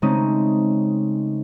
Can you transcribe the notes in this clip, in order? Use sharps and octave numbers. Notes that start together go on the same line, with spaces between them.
C#3 G#3 A3 C4 C#4 D#4